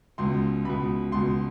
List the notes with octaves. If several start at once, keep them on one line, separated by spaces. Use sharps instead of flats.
C#2 B2 C6
C#2 B2 B5
C#2 B2 C6